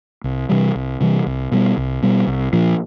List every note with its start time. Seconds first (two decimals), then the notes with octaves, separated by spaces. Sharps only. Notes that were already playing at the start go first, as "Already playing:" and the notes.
0.24 C2
0.49 C3 E3 G3
0.75 C2
1.01 C3 E3 G3
1.26 C2
1.52 B2 G3
1.77 C2
2.02 B2 G3
2.27 C2
2.53 A#2 F3